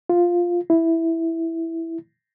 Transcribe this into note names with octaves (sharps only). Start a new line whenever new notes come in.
F4
E4